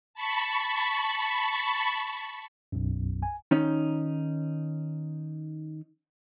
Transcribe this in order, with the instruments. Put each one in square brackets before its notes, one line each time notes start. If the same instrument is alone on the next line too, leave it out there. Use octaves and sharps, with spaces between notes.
[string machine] A5 B5 C#6
[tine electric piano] B1 F#2
G#5
[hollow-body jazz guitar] D#3 C#4 D#4